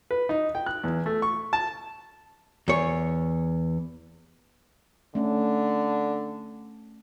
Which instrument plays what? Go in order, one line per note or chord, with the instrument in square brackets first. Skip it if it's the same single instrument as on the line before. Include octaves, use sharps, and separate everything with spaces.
[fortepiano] B4
D#4
G5
F#6
E2
A3
C#6
A5
[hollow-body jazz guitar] E2 C#5
[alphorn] D3 [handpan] A3 C#4